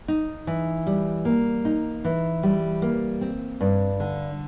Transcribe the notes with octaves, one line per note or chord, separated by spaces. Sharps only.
D#4
E3
G3
A#3
D#4
E3
G3
A#3
C4
G2
D3